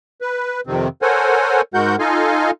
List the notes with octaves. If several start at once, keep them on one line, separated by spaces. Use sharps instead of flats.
B4
F2 C3 D#3 C4
A4 A#4 C5 C#5 F#5 G#5
G#2 G#3 F#4 A#4 F#5 G6
D#4 F4 A4 D#5 F5 G#5